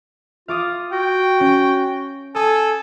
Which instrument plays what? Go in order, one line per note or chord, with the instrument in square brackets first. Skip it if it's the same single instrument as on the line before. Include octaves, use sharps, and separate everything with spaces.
[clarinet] F4 [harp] F5 D6 D#6
[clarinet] F#4 [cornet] G5
[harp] C#4
[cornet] A4 [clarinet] G#5 [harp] D#6